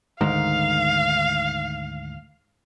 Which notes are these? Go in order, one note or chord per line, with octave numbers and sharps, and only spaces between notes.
D2 G#2 D#3 F5